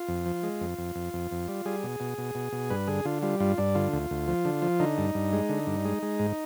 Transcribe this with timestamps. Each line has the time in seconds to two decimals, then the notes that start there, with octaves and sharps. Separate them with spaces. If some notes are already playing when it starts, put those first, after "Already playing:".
Already playing: F4
0.08 F2
0.26 F3
0.43 G#3
0.61 F2
0.78 F2
0.95 F2
1.13 F2
1.31 F2
1.48 G3
1.65 G3 G#4
1.84 B2
2.00 B2
2.18 B2
2.35 B2
2.53 B2
2.70 G2 B4
2.87 D3 G#4
3.05 D3 F4
3.22 G3 F4
3.40 G2 F4
3.58 G2 D4
3.75 D3 F4
3.93 D2
4.11 D2
4.28 F3
4.45 D3
4.62 F3
4.80 D3 D#4
4.98 G2
5.15 G2
5.33 G#3
5.49 D3
5.67 G2
5.85 G#3
6.03 G#3
6.19 G#2